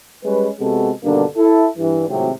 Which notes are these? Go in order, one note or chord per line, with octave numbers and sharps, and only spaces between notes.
G3 G#3 C#4 B4
C3 G#3 B3 F#4 A4
G2 B2 D3 D#3 A#3 D4
E4 A4
G2 E3
G#1 A2 C3 F#3 C4